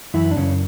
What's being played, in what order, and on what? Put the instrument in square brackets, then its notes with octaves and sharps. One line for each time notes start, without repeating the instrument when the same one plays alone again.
[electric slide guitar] F#2 E3 E4
D4
F#2 C#3 C#4